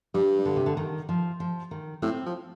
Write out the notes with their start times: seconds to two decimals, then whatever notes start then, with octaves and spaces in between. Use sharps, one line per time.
0.14 G2 G3
0.45 D3
0.56 C3
0.66 D3
0.77 D#3
1.09 F3
1.40 F3
1.71 D#3
2.02 A2 C4
2.26 F3